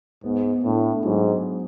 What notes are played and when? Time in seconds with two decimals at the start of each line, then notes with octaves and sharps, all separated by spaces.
0.24 G#2 B3
0.64 A2 D4
1.04 G#2 F#3